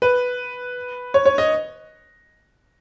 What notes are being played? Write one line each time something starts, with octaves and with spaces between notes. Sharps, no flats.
B4
C#5
C#5
D#5